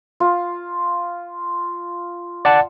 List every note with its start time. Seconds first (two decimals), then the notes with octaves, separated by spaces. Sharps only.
0.20 F4
2.45 D5 F#5 A5